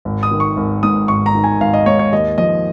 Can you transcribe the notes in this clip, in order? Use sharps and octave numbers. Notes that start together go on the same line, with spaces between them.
G#1
D#6
D#3
C#6
G#1
G#2 D#6
G#1 C#6
A#5
D#3
G#5
G#1 F5
D#5
G#2 C#5
C#5
D#2 D#5
F3 D#5